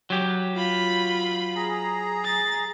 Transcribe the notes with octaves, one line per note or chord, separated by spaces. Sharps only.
F#3 G4
F4 B5
G#4 A#5
A6